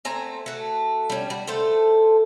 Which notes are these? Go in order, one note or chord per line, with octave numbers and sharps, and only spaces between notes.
A3 C4 G#5 A#5
A3 F#4
G3 C#4
G3 F#4
A3 A4 C5